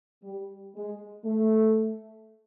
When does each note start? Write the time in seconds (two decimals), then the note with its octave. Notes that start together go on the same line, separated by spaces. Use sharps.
0.23 G3
0.74 G#3
1.24 A3